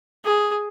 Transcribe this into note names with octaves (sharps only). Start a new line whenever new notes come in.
G#4